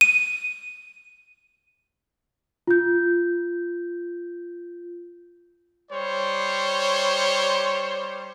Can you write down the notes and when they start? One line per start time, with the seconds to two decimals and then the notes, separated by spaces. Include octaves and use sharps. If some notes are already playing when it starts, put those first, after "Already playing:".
0.01 D#7
2.67 F4 G6
5.91 G3 C5 C#5